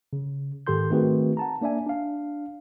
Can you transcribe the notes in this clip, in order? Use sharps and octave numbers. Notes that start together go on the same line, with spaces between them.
C#3
G#2 D#3 G4 A4 C6 G6
D#3 A3 C4 F#4 G#4 B4
F#5 A5 A#5
A#3 D4 D5 E5 G#5
D4 F5